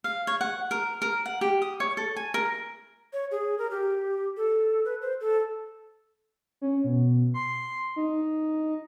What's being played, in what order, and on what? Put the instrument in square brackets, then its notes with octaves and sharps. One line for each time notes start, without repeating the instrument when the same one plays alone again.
[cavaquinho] F5
C#5
F#5
A#4
A#4
F#5
G4
D#6
C#5
A4
G#5
A#4
[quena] C#5
G#4
A#4
G4
A4
B4
C5
A4
[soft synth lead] C#4
B2
C6
D#4